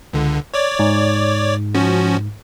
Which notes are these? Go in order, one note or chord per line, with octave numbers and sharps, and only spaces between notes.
C#2 D3
C#5 D5 D6
G#2
F3 C#4 F#4